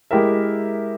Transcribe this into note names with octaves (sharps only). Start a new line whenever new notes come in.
G#3 E4 G4 A#4 E5